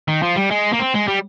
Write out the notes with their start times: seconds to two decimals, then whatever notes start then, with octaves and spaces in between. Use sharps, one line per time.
0.08 D#3
0.23 F3
0.36 G3
0.50 G#3
0.72 A#3
0.79 C4
0.94 G#3
1.07 G3